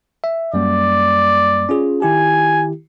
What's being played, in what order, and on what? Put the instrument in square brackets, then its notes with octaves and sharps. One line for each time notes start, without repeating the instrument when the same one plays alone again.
[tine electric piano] E5
[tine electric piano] F#2 G3 A#3 [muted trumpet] D5
[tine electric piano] C#4 F4 G#4
[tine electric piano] D#3 E4 G4 [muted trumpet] G#5